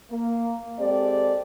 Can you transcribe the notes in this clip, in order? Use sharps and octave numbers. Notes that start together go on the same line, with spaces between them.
A#3
G#3 C4 G4 A4 D5